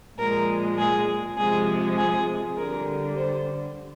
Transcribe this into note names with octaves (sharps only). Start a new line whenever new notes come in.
A#2 F3 G#3 A#4
G#4
C3 F3 G#3 G#4
G#4
D3 G3 A#4
C5